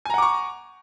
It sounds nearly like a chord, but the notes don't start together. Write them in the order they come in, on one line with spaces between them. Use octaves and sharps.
G#5 A#5 F#5 D6 C#6